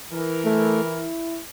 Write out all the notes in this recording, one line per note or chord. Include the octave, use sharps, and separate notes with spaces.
E3 A#4
A3
E4